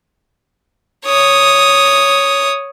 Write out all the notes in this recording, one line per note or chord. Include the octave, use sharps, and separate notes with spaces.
C#5 D#6